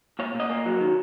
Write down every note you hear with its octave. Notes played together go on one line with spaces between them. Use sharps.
A#2 C#5
A#2
D#5
A#3
F#3
D#3